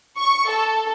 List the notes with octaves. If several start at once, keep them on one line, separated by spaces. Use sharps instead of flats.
C#6
A4